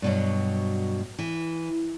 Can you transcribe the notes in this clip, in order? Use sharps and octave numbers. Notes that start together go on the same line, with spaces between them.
G2 B2 F#3
E3